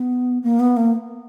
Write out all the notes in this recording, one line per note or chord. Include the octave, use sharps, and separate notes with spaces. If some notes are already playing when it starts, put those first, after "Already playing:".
Already playing: B3
A#3
B3
A#3